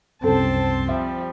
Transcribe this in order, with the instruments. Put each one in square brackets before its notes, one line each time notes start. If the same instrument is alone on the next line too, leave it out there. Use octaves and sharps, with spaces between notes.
[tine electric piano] C2 F#2 [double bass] C4 [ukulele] A4 [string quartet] A5 C6
[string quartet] F3 G3 [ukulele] E5